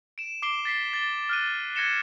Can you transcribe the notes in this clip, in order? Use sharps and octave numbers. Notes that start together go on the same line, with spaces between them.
D7 E7
D6 C7 D7 G7
A6 B6 C7
A6 G7
F6 F#6 D#7
F#6 G#6 A#6 C#7 E7 G7